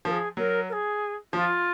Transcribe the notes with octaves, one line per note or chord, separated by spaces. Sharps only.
F3 A#4
G#4
F#3 A#4
A#4
G#4
F3 F4